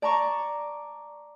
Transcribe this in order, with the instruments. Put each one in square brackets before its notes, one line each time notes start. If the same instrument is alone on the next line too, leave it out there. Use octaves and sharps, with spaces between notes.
[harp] D5 A5 A#5 C#6